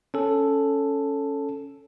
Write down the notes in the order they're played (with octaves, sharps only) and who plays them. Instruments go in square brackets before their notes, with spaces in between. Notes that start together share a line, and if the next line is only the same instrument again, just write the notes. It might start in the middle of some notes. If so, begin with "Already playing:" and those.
[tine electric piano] C#4 A4